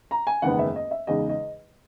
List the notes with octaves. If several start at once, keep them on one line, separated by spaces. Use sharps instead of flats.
A#5
G#5
F#1 E2 D#3 G#3 B3 F#5
E5
D#5
E5
E2 C#3 G#3 D#4 D#5
D#5